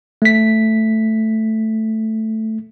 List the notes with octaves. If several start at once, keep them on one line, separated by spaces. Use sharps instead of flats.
A3 B6